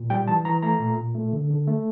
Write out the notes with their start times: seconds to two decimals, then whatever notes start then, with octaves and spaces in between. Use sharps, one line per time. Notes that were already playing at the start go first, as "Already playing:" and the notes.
Already playing: A#2
0.10 G3 G5
0.28 E3 A5
0.45 E3 A#5
0.62 A3 A#5
0.80 A#2
0.97 A#2
1.15 A3
1.33 D3
1.50 D3
1.67 A3